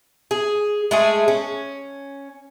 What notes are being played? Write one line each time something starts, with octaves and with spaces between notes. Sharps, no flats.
G#4
G#3 A3 G#4
C#4